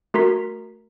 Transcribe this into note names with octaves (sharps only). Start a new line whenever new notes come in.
A3 F#4 A#4 A#5 C6 B6